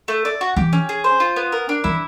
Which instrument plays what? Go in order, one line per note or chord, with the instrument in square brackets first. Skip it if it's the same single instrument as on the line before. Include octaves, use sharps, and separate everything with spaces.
[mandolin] A3
D5
F#4
[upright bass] E3 [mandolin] G4
[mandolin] C#4
G#4
C5
F4
B3
A#4
D4
[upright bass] E3 [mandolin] E4